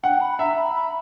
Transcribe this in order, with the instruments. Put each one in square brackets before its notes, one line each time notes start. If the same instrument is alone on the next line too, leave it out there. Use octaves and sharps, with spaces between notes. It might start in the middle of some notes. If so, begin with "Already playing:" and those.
[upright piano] F#5 [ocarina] G5
[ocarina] B5
[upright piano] E5 [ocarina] A#5
[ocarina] B5
B5